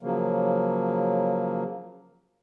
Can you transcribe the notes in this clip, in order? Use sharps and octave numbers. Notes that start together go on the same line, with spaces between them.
C#3 F3 F#3 A#3